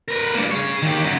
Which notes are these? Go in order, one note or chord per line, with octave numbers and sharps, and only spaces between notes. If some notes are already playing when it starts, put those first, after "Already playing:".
A#4 B4
G2 A#3
G#4 C#5
D#3 G4
C#3 F#3